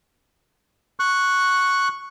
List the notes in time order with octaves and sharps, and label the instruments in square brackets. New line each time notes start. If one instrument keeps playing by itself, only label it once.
[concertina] C#6 F#6